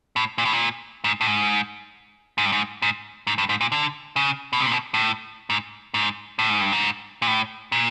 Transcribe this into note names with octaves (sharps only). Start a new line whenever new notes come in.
A2
A#2
A2
A#2
G#2
A2
G#2
G#2
G2
G#2
G#2
G#2
G2
G#2
A#2
D3
C#3
B2
C3
A#2
B2
A2
G#2
G#2
A2
G#2
G2
G#2
A#2
A2
A#2